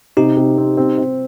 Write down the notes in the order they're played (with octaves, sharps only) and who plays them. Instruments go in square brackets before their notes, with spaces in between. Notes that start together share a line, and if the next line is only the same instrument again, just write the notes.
[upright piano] C3 [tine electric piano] D#4 G4
[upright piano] C3
C4
C4
C4